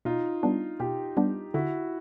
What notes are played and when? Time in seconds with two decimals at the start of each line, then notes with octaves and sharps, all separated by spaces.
0.05 B2 D#4 F4
0.43 G3 B3 D4
0.80 B2 F4 G4
1.17 G3 B3 D4
1.54 D3 E4 F#4